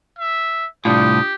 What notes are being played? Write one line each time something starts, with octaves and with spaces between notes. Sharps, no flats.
E5
C2 A2 D4 F4 G4 D#6